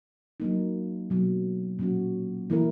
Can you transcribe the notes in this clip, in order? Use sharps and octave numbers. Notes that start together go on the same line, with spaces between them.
F#3 A#3 D#4
B2 F#3 A#3
A#2 F#3 A#3 C#4 F#4
E3 A#3 E4 A#4